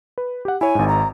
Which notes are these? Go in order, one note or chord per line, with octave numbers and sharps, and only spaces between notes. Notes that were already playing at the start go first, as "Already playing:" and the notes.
B4
G4 F#5
E4 C#5 G#5
G#1 G#2
A#5